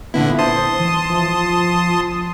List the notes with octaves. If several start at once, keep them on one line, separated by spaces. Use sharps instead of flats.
A#2 D3 B3 E4
C5 A5 C6 D#6
E3
F3